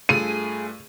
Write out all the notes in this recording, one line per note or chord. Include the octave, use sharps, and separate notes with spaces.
G2 A3 F4 G#4 D#7